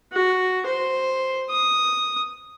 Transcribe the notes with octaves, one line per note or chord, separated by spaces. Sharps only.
F#4
C5
D#6